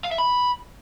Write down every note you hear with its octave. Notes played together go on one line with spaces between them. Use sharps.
F5
E5
B5